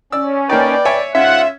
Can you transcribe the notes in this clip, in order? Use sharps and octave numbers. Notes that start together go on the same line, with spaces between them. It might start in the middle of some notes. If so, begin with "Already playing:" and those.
C#4 D5 E6
A#3 D#4 B4 D5 G5
C#5 E5 G#5
G#2 C#4 F4 E5 F#5